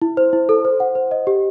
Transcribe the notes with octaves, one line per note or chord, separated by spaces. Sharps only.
E4
C5
E4
A4
C5
F#5
C5
D#5
G4